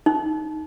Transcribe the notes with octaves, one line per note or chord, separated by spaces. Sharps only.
D#4